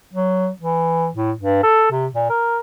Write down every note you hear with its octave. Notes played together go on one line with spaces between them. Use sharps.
F#3
E3
A2
G2
A4
C3
A#2
A#4